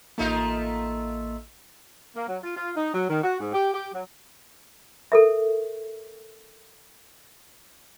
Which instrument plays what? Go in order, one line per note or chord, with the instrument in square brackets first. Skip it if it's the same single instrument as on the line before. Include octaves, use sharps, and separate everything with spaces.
[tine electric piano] A1 A#3 [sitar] A3 D#4 F4
[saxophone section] A#3
F#3
F4
F4
D#4
F#3
D#3
F#4
G#2
G4
G4
F#3
[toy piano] A4 A#4 E5